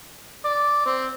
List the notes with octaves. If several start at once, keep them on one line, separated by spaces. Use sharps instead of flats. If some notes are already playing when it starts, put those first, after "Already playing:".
D5
C4